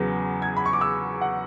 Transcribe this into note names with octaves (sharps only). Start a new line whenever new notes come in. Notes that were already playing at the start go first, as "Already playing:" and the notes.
Already playing: E2 C#3 F#3 B3
G#6
B5
C#6
D6
E6
F#5